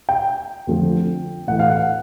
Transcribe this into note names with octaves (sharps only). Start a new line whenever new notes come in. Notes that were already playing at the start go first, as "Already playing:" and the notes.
G5
F2 D3 F3 A3
A2 E3 A3 F#5
F5
F#5